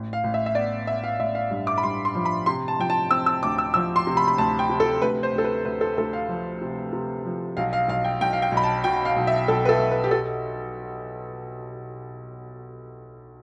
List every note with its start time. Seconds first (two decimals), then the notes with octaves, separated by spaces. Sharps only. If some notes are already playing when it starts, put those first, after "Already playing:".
Already playing: A1
0.13 F5
0.24 A1
0.34 E5
0.46 E5
0.55 B3 D5
0.87 B3 E5
1.04 F5
1.20 A1 E5
1.35 F5
1.51 G2
1.67 D6
1.78 B5
1.83 G2 C6
2.05 C6
2.15 F3
2.25 B5
2.46 C3 C6
2.68 A5
2.79 F3 G5
2.90 A5
3.11 C4 E6
3.26 E6
3.43 D2 D6
3.58 E6
3.74 F3 E6
3.96 C6
4.07 C3
4.17 B5
4.28 B5
4.38 D2 A5
4.59 G5
4.69 C3
4.80 A4
5.02 D2 B4
5.23 C5
5.34 D2 A4
5.44 B4
5.65 D2 B4
5.81 A4
5.97 D2 A4
6.13 F5
6.29 F3
6.61 C3
6.93 C3
7.25 F3
7.57 B1 F5
7.73 F5
7.88 B1 F5
8.04 G5
8.21 B1 G5
8.33 F5
8.42 G5
8.52 B1
8.57 B5
8.64 A5
8.84 B2 G5
9.05 F5
9.16 B1
9.27 E5
9.48 B1 A4
9.65 B4
9.69 A4
9.79 B1
9.91 B4
10.04 G4
10.11 A4